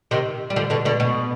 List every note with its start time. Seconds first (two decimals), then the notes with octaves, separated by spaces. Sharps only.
0.11 C3 D#3
0.50 G3
0.56 D3 F3
0.70 B2 D3
0.85 B2 D3
1.00 B2